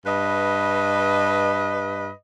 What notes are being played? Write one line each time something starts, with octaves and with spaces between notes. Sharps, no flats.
G2 B4 D#5